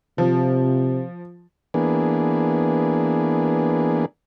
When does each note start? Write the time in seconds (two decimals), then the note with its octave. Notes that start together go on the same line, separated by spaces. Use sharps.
0.18 C3 F3
1.74 E3 A#3 B3 D4 G#4